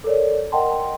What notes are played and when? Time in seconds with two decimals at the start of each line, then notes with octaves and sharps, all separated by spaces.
0.04 A4 A#4 C#5 D5
0.52 A#4 D#5 F#5 G5 A5 C6